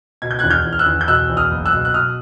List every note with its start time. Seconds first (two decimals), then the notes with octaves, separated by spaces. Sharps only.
0.22 B2 G#6
0.31 G6
0.39 F#6 G#6
0.43 E2
0.50 F6 G6
0.65 E2
0.73 F6
0.79 E6 F#6
0.86 E2
1.01 G6
1.08 B2 E6 F#6
1.29 E2
1.37 D#6 F6
1.51 F#1
1.66 E6 F#6
1.73 B2
1.85 F#6
1.94 B2 D#6 F6